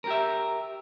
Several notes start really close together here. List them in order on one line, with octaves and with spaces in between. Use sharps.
A#4 G4 E5